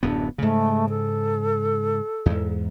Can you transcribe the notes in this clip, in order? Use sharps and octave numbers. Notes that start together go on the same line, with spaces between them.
D1 F#2 B3 D4
G#2 C#3 A3
A4
E2 G#2